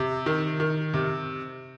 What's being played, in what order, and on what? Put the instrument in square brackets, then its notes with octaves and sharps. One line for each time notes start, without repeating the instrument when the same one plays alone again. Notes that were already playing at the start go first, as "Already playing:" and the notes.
Already playing: [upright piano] C3
D#3
D#3
C3